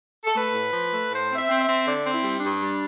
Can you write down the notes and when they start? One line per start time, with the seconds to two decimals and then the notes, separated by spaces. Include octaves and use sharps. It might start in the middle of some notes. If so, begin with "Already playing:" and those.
0.24 A4
0.35 A3 B4
0.54 A2
0.73 F3
0.92 A3
1.11 A2 C5
1.30 C4
1.36 E5
1.49 C4
1.61 E5
1.67 C4
1.86 D3 D5
2.05 C4
2.11 E4
2.23 G3
2.36 D4
2.43 G2
2.62 G3